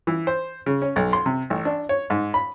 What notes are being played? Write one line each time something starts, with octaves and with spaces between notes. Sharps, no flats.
E3
C5
C#3
C#4
B1
C6
C3
A1
D4
C#5
G#2
B5